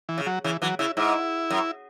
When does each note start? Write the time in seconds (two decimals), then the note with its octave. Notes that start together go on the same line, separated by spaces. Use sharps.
0.09 E3
0.18 C#3
0.26 F#3
0.44 C#3 E3
0.62 E3 F#3
0.79 C#3 E4
0.97 G#2 E4
1.50 F#2